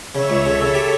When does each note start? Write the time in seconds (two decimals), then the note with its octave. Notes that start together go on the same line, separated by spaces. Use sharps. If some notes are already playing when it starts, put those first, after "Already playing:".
0.15 C#3 C#5 E5
0.30 C#2
0.45 C#3 A4 C#5
0.61 C#3
0.75 G4